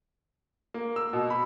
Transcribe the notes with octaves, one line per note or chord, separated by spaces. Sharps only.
A#3
E6
B2
B5